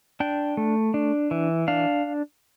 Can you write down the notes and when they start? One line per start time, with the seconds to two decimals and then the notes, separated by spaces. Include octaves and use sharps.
0.20 D4 G5
0.57 A3
0.94 D4
1.31 E3
1.68 D4 F5